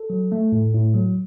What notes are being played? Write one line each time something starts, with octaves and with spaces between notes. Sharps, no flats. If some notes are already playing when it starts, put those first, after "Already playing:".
Already playing: A4
F#3
A3
A2
A2
F#3